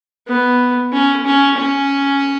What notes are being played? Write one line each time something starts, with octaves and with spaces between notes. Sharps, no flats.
B3
C#4
C#4
C#4